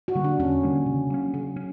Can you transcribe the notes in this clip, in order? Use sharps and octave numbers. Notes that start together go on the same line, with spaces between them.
F#4
D3 G3 A#3
D4
E2 C#4
D3 G3 A#3
C#3 E3
F#3 A#3 C#4
C#3 F#3
C#4